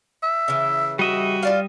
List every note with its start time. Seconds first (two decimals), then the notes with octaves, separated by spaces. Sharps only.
0.23 E5
0.48 C#3 E3
0.99 G3 F#4 D#5 E5
1.43 F4 D5 F5